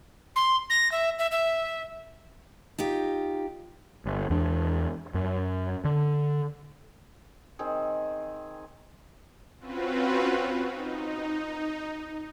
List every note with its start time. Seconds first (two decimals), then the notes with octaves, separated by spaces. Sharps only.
0.36 C6
0.70 A#6
0.92 E5
1.19 E5
1.32 E5
2.78 D#4 F4 G4
4.05 G1
4.30 E2 D4
5.14 F#2
5.85 D3
7.59 D#3 C4 G#4
9.59 C4 C#4 F4 F#4 B4
10.69 D#4